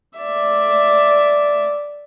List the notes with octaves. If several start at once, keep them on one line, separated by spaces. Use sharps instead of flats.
D5 E5